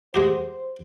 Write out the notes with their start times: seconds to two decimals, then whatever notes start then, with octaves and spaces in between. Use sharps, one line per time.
0.14 G#3 F#4 G4 C5